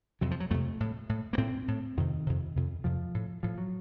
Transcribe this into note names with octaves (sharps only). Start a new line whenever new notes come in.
F2 C3 F#3
F3
F#3
F2 C3 A3
A2
A2
A#3
A2 C4
A2
F2 C3 D#3
F2 C3
F2 C3
F2 C3 F3
A2
A2 F3
F#3